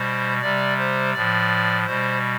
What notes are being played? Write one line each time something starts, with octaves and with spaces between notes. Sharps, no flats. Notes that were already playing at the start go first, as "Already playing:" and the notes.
Already playing: B2 G3 C5
C3 G3 D5
C5
A2 F3 D5
B2 G3 C5